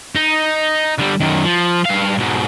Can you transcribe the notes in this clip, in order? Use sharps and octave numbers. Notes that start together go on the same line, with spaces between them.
D#4
D3 G3
F#2 D#3
F3
G2 F5
G#2 B2